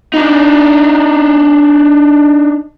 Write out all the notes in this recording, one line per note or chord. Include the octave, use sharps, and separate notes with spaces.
D4 D#4